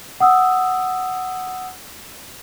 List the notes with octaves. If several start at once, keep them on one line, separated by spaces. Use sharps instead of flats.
F#5 D#6 E6